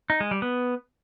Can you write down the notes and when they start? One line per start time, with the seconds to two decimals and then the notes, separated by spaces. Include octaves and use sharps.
0.10 D#4
0.20 G#3
0.31 G3
0.42 B3